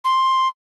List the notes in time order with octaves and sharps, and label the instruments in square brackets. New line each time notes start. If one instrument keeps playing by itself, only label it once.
[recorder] C6